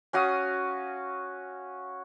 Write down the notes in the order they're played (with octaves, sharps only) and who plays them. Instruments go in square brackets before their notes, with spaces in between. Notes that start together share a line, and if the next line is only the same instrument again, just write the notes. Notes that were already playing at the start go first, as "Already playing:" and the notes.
[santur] C#4 F#4 F5 D#6